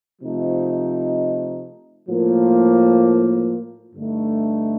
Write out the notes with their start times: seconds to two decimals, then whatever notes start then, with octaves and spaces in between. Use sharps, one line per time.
0.22 C3 F3 A3 D#4
2.08 A2 F3 A#3
3.94 G2 D3 A3 D#4